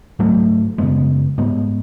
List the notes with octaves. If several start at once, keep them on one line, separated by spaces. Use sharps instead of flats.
G#2 F#3 A3
F#2 C#3 G#3 B3
G#2 G#3 B3